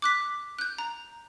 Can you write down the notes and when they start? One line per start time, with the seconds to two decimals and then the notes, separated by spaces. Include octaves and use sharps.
0.02 D6 F#6 B6
0.59 F#6 G6
0.78 A#5